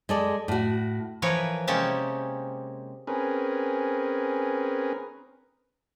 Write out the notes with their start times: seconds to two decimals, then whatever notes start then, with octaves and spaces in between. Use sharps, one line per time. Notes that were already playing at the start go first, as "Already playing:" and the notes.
0.09 G#3 A4 D5
0.48 A2 F#4
1.22 E3 F3 A#4 B4 C#5
1.67 C3 G#3 A#3 C#4 G4 A5
3.07 C4 C#4 G#4 A#4 B4